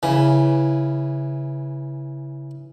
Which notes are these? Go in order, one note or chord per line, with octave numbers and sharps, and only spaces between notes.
C#3 E3